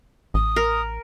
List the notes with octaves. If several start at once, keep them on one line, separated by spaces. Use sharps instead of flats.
A1 D#6
A#4